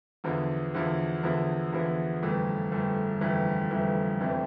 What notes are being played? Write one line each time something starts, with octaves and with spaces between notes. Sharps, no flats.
E2 D3 F3 B3 E4
E2 D3 F3 B3 E4
E2 D3 F3 B3 E4
E2 D3 F3 B3 E4
G1 F2 E3 A3
G1 F2 E3 A3
G1 F2 E3 A3
G1 F2 E3 A3
F1 F2 E3 A3 C4